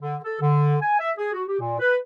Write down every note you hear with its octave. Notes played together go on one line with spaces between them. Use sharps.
D3
A4
D3
G#5
E5
G#4
F#4
G4
A#2
B4